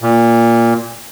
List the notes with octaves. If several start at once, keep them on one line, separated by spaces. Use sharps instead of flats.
A#2